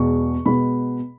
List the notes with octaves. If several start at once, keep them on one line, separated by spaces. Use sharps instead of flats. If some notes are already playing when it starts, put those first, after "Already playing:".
Already playing: E2 B2 G#3 B3 C#6
B2 G#3 B3 B5